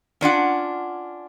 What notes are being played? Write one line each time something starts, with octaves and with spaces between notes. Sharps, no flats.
C#4 D4 F4 F#5